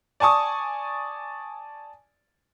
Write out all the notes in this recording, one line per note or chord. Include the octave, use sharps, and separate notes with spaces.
D5 G#5 A5 C#6 D#6